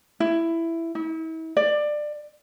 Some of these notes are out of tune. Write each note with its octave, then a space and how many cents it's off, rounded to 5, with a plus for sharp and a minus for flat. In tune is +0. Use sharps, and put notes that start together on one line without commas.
E4 +10
E4 -40
D5 +20